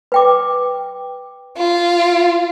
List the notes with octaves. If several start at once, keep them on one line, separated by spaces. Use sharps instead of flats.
B4 G5 D6
F4